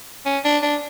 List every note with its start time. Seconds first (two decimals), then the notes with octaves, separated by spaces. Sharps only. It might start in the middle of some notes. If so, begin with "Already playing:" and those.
0.25 C#4
0.45 D4
0.63 D4